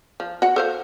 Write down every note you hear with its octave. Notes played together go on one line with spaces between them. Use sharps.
F3
F#4 F#5
A4 C5 F5